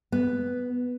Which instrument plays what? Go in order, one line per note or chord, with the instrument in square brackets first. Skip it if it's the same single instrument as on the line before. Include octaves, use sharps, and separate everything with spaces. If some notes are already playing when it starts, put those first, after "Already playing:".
[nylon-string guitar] B3